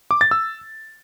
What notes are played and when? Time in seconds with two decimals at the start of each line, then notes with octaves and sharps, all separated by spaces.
0.11 D6
0.21 A6
0.31 E6